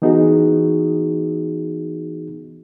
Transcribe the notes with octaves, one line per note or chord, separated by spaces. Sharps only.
E3 B3 D#4 F#4 G#4